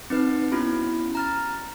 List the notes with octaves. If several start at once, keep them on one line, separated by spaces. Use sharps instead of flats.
C4 D#4 B4
B3 C#4 E4 F#4 B5
A#5 F6 A6